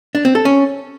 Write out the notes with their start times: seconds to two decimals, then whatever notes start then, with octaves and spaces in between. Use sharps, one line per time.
0.15 D4
0.25 C4
0.35 A4
0.45 C#4